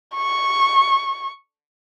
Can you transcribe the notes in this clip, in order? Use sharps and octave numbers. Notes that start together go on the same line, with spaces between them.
C#6